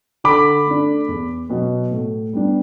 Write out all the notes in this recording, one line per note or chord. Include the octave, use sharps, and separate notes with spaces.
D3 B5 D6
A3 D4
E2
B2 F#3 B3
A2
G3 B3 D4